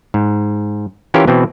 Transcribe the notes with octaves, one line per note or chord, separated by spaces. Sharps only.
G#2
E3 C#4 F4 G4 A#4
B2 E3 C4